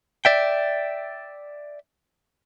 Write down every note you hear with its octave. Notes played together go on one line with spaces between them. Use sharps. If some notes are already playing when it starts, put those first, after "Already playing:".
D5 E5 G5